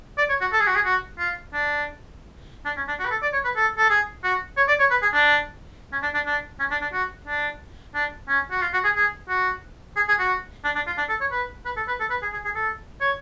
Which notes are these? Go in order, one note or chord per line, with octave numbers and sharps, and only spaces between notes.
D5
C#5
F#4
A4
G#4
F#4
G#4
F#4
F4
D4
D4
C#4
D4
F#4
B4
A4
D5
C#5
B4
A4
A4
G#4
F#4
C#5
D5
C#5
B4
G#4
D4
C#4
D4
D4
D4
C#4
D4
D4
F#4
D4
D4
C#4
F#4
F4
F#4
G#4
G#4
F#4
G#4
G#4
F#4
D4
D4
F4
D4
A4
C#5
B4
B4
A4
B4
A4
B4
G#4
G#4
G#4
A4
C#5